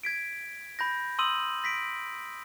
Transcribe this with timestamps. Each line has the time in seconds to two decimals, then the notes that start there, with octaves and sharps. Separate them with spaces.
0.03 G#6 B6 D7
0.79 B5 G6 A#6
1.19 C6 D#6 E6 D#7 F#7
1.64 A#6 B6 D7